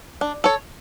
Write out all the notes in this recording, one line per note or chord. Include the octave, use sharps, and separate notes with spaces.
D4
A4 C#5